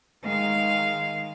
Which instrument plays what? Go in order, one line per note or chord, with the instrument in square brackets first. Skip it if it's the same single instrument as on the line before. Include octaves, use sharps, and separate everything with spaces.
[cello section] D#3 G#3 [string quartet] F5